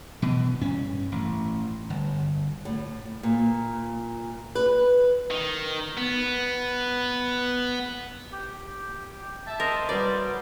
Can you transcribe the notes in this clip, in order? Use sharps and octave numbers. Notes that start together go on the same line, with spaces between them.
B2 E3
G2 C#4
A1
G1
A2
A#2
B4
D#3
B3
G4
E5 A5
A#4 C5 D#5
F#3 G3 B4 C5 D5